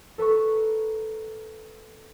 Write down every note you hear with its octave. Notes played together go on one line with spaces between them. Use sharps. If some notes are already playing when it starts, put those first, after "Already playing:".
A4 B4 A#5 C#6